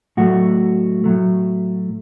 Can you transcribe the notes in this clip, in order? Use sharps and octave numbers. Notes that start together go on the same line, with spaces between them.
A2 F#3 A3 F#4
A2 F#3 A3